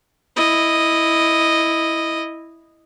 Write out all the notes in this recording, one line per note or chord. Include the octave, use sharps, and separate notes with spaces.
E4 D#5